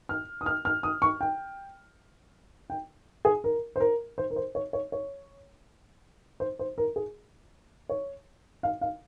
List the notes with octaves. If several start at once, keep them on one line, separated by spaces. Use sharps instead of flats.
F6
D#6
F6
F6
D#6
C#6
G5
G5
G#4
A#4
C5
A#4
C5
A#4
C5
C#5
C#5
C#5
C5
C5
A#4
G#4
C#5
F5
F5